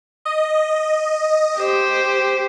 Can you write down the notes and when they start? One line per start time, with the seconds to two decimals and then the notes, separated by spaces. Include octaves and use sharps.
0.25 D#5
1.58 G4 C5